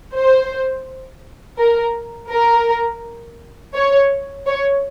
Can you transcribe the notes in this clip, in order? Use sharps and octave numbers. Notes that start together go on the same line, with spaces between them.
C5
A#4
A#4
C#5
C#5